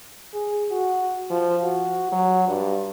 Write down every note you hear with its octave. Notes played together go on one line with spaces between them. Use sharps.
G#4
F#4
F3
F#4
F#3
G2